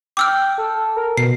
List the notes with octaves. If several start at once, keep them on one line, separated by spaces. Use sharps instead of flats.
G5 D6 E6 F6
A4
A#4
B2 C7